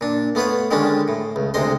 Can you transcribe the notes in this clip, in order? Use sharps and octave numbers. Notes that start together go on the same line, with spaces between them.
A#2 D4
A3 B3 F4 B4 C#5
D3 D#3 G3 G#3 C#4 D4
A2
C#2
D2 C3 G#3 D#5 C6